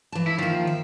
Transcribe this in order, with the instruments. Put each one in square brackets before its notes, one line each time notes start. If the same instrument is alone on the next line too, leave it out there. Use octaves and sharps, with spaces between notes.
[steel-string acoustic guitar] E3 A5
[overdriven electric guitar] E4
[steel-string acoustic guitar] D#3 A#3 [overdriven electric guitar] F3
[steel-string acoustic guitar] E5